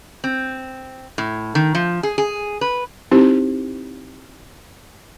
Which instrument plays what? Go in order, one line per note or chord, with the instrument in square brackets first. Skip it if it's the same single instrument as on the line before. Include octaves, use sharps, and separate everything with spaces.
[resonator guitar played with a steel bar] C4
A2
D#3
F3
G#4
G#4
B4
[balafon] C4 D#4 E4 G4 C5